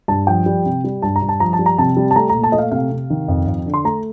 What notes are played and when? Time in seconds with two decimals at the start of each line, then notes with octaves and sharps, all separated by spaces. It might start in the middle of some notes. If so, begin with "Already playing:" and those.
0.08 G2 A5
0.27 F3 G5
0.46 G3
0.66 C3
0.84 G3
1.02 G2 A5
1.16 A#5
1.22 G2
1.29 A5
1.40 F3 A#5
1.53 A5
1.59 G3
1.66 A#5
1.78 C3 A5
1.97 G3
2.11 A5
2.16 A3 A#5
2.29 A#5
2.35 A#2
2.43 A5
2.52 A3 D#5
2.58 F5
2.71 C3 F5
2.91 C3
3.10 D#3
3.28 F2
3.47 F2
3.66 D3
3.74 C6
3.85 A3 A#5